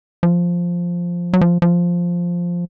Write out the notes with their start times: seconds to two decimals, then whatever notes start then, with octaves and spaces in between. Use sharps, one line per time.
0.23 F3
1.33 F#3
1.41 F3
1.62 F3